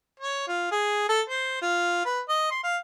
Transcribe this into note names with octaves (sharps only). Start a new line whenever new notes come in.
C#5
F4
G#4
A4
C5
F4
B4
D#5
C6
F5